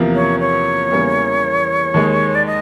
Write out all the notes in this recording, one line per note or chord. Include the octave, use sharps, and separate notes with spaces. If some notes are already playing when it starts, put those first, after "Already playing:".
Already playing: E2 C3 F3 A#3
C#5
C#5
E2 C#3 E3 G3 A#3
D#2 D#3 G#3
D5
D#5